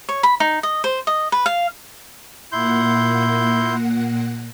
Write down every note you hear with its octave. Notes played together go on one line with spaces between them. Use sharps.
C#5
B5
D#4
D#5
C5
D#5
B4
F5
A#2 A#3 E4 F#5 C6 G6